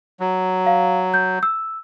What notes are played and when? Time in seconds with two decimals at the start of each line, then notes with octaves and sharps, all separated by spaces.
0.20 F#3
0.66 F5
1.14 G6
1.43 E6